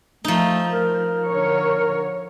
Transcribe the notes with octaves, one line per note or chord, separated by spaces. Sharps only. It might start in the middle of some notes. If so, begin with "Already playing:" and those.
F3 A3 D#4
A#4
D3 C#5